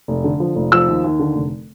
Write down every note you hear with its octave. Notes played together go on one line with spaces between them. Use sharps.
F1
D3
F3
F1
F3 E6
D#2
D#2
D3
F1